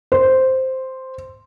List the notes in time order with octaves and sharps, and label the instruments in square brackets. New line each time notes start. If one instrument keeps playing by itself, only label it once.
[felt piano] C5